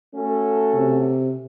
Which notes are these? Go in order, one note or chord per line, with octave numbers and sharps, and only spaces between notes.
A3 C#4 F#4 A4
C3